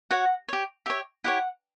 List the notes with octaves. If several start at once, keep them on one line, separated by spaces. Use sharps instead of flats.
F#4 C#5 F#5
G4 C#5
G4 C#5 E5
E4 G4 C#5 F#5